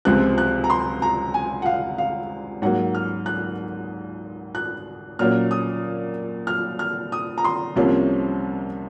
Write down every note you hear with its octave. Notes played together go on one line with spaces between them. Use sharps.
C#2 C3 F3 G#3 C4 F#6
F#6
A#5
C6
A#5
G#5
F#5
F5
F5
G#2 F#3 A#3 F#5
F6
F#6
F#6
A#2 F#3 A#3 C#4 F6
D#6
F6
F6
D#6
A#5
C6
C2 C3 F3 A#3 C#4